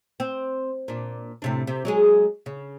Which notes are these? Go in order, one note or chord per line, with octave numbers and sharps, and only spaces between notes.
C4
A#2 D4
A2 C3 D4
C3
F#3 G#3 G#4
C#3